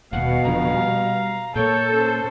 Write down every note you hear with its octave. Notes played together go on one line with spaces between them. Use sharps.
D#1 B2 F5 F#5
F1 D3 F3 A#5
G3
A#2 A#3 A4 C#5 G6
C#4 C5